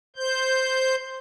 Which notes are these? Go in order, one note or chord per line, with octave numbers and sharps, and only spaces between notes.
C5 G6